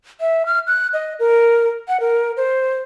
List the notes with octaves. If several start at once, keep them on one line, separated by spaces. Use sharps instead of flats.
E5
F6
F#6
D#5
A#4
F#5
A#4
C5